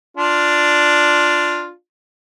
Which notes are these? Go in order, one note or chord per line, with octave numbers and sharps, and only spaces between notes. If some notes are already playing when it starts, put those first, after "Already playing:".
D4 F4